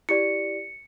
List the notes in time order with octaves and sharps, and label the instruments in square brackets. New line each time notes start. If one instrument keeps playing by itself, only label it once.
[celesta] E4 G4 D5 [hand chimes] C#7